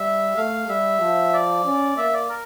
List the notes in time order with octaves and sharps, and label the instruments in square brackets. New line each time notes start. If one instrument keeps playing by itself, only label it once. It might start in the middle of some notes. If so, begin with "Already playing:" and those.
Already playing: [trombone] G3 [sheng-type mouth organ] E5
[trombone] A3 [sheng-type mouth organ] F5
[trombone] G3 [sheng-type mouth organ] E5
[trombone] F3
[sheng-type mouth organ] D5
[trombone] C#4
[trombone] A#3 [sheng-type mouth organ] E5
[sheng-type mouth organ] D5
A#4